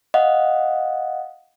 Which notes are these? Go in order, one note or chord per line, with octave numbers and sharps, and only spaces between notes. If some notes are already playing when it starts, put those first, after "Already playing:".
D#5 F5 F#5